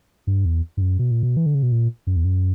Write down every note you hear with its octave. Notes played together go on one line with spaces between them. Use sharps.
G2
E2
G2
F#2
B2
A#2
B2
E3
D3
C#3
B2
A#2
F#2
E2
F#2